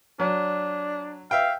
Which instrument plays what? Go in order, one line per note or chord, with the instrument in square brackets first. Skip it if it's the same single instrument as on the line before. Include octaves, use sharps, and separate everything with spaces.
[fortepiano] F#3 [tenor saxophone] D4
[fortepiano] E5 G5 [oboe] F5